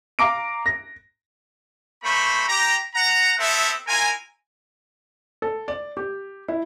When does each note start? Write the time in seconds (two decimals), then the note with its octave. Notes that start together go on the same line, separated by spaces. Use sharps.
0.19 F5 A#5 D6 D7
0.66 A#6
2.04 G3 A3 A#3 C5 B5 C#6
2.48 G4 A#5
2.95 F#5 A#5
3.38 B3 C4 A4 E5
3.88 E4 F4 A#4 G#5
5.42 A4
5.68 D5
5.97 G4
6.48 E4